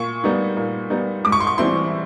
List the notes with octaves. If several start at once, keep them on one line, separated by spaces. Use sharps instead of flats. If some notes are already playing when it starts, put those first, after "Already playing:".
Already playing: A#2 C#6
G3 B3 D#4
A#2
G3 B3 D#4
G#2 D6
C#6
C6
C#6
E3 G3 C4 E4 C6